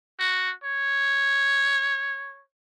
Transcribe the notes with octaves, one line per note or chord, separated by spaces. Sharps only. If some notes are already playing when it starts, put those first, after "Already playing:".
F#4
C#5